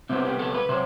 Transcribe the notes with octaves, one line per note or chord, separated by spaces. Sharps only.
C3 G3 B3 C4
G4
A4
B4
C3 F#3 C5